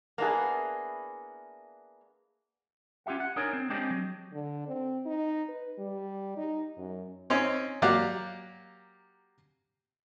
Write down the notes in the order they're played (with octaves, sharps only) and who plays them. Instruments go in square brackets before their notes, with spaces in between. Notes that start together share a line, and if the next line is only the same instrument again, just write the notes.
[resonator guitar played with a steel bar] A#3 B3 D4 E4 G#4
[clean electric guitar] C#4 F4 G4 E5 F#5
F#5
D4 D#4 G#4 A#4 C#5
C4
G#3 C4 D4 G4 G#4 D#5
F#3
[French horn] D3
C4
D#4
B4
G3
D#4
F#2
[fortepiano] C4 C#4 D#4 C#5
F#3 A#3 G4 D5 F5 F#5